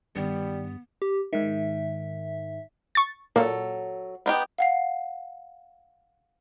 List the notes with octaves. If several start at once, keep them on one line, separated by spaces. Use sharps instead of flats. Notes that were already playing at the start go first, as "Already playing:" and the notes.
G2 D#3 G3 B3
G4
G#2 D#3 E5
C#6 A6
A#2 F#3 A4
B3 D#4 G4
F5 F#5 C7